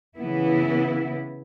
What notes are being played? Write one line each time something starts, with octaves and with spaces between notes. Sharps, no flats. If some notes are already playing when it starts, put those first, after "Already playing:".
C#3 E3 B3 E4